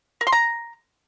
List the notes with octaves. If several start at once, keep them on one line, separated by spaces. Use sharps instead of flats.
A#4
C6
A#5